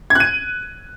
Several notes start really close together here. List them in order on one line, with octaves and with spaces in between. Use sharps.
G#6 F#6 D#7